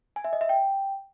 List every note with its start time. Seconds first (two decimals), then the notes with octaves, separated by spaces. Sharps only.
0.16 G#5
0.24 E5
0.33 D#5
0.41 E5
0.49 G5